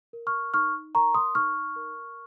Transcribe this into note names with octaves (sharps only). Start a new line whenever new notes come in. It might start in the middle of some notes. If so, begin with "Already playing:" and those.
A#4
C#6 F6
D#4 C#6 F6
A#4 A#5 C#6
C6 D#6
D#4 C#6 F6
A#4